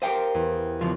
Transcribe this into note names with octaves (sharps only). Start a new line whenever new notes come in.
G4 A#4 C5 D#5 F5 G5
E2
E2 G2 C#3 F3